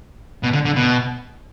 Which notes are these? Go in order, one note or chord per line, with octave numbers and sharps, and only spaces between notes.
B2
D3
D3
B2